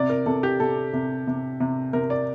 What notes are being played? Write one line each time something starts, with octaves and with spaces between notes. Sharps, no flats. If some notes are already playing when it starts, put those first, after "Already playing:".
Already playing: C3 D5
A#4
C3 A4
G4
C3 A4
C3
C3
C3
C3 A#4
D5